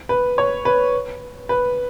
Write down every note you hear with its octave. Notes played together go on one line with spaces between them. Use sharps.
B4
C#5
B4
B4